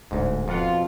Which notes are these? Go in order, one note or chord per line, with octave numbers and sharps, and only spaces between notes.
D1 D2 G#2
F2 B2 F4 F#5